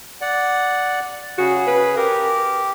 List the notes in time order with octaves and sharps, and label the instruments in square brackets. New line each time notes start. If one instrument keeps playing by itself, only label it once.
[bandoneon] D5 F#5
[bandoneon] C#3 G#4 [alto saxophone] F#4
[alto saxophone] B4
[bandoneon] G4 [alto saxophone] A#4